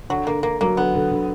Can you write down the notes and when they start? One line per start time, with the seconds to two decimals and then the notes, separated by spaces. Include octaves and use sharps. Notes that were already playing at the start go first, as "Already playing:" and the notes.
0.10 D3 F#3
0.27 D3 A#3
0.43 D3 A#3
0.61 F#3 A#3
0.77 D3 B3
0.95 D3
1.11 D3